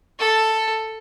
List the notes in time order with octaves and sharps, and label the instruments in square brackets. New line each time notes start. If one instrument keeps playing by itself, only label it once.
[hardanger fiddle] A4